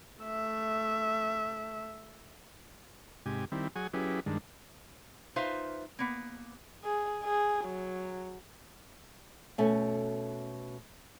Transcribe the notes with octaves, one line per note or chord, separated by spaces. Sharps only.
A3 E5
G#2 C3 G4 G#5
D#3 G3 C4 E4
F#3 G#4 F#5 G#5 C#6
F#3 C#4 E4 G4 G#4 B4
G2 D#3 G#3 D4
D#4 F4 B4 C5 E5 F5
A#3 B3
G#4
G#4
F#3
B2 A3 C#4